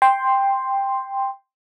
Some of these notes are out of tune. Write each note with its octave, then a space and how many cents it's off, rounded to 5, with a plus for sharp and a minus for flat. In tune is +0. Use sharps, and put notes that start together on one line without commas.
G5 +10 C6 +0